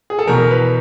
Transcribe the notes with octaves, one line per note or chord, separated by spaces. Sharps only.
G#4
A4
E2 B2 A#4
B4